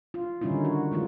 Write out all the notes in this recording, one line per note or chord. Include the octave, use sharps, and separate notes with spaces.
F4
D3 D#3 G3 C#4 D#4 E4
F#4
E3 G#3 D#4 F4